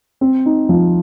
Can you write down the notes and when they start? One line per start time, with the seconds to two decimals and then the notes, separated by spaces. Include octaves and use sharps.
0.21 C4
0.46 D#4
0.69 F3